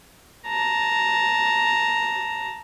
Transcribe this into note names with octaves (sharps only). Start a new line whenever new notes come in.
A5 A#5